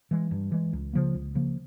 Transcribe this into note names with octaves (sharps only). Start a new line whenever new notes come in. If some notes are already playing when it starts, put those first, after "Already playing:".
E3 G#3
G2
E3 G#3
C#2
C#3 F3 A#3
C#2
C#3 F3 A#3